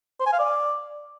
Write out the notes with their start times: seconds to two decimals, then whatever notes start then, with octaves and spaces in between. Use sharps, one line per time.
0.20 C5
0.26 G#5
0.33 F5
0.39 D5